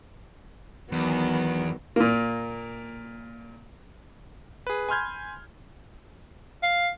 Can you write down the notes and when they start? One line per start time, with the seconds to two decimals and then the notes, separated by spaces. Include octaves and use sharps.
0.92 E2 D#3 F#3 B3
1.96 A#2 A#3
4.67 G#4 B4
4.89 G#5 B5 C6 F6 G6 G#6
6.63 F5